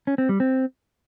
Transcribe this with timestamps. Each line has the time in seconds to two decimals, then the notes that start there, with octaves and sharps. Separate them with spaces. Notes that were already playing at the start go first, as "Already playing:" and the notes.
0.07 C#4
0.18 C4
0.29 G3
0.40 C4